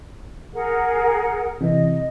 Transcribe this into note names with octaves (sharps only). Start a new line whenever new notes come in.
G#4 A#4 F#5
C3 E3 D#5